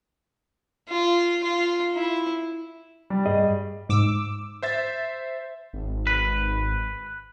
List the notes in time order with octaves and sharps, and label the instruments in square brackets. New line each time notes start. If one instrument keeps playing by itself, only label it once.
[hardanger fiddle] F4
F4
E4
[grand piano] G3
[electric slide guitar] G2 G#4 D#5
[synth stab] G#2 D6 E6
[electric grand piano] C5 E5 A6
[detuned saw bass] G#1
[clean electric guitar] B4